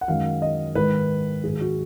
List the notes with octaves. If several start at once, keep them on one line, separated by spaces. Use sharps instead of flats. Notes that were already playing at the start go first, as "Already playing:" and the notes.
F#5
F#2 D#3 G#3 F5
D#5
G#2 D#3 G#3 B4
G#2 D#3 F#3 G#4
F#4